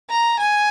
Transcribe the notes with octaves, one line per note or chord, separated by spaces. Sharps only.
A#5
G#5